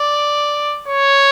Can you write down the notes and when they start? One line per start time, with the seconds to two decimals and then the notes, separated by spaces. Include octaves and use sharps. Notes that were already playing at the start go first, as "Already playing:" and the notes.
Already playing: D5
0.88 C#5